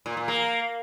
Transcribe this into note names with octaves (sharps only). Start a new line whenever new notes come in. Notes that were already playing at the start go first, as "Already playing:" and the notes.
A#2
A#2
A#3